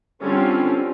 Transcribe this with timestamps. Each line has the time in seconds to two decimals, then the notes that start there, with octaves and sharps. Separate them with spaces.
0.21 D3 G3 C4 C#4 F4 G4